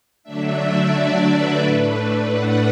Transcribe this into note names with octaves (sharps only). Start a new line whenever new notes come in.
D3 F#3 A3 D4 E5
D5
B4
A2 A3 D4
F#5